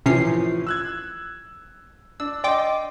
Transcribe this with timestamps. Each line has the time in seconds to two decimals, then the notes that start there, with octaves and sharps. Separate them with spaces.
0.06 A2 C3 E3 F3 C#4 C7
0.67 E6 F#6 G#6
2.20 D4 E6
2.44 D5 D#5 G5 C6 D6